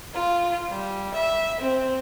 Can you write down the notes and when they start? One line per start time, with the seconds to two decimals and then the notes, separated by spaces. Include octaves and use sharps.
0.13 F4
0.69 G3
1.14 E5
1.61 C4